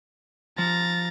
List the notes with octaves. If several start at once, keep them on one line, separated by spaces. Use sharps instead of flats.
F3 A#5 A6